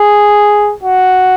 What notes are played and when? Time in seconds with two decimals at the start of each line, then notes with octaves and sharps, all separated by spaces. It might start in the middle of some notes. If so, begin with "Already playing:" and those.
Already playing: G#4
0.83 F#4